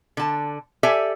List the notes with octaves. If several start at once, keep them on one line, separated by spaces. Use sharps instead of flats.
D3 A5
G4 A4 D5 E5 G#5